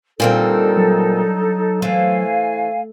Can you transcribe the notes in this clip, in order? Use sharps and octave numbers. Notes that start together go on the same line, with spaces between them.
A#2 D3 G3 A#3 C4 D#4 A4
F#3
E3 A3 C4 F5 G#5